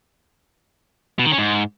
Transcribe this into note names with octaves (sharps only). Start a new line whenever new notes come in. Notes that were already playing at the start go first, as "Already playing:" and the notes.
B2
D#3
C#4
G#2